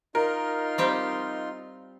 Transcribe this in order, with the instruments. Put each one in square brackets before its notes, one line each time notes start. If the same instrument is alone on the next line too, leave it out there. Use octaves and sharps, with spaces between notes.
[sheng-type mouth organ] D#4 F4 C6 [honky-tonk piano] A#4
[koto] G3 C4 G4